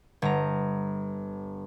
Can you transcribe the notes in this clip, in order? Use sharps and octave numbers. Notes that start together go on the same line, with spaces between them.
G1 A#5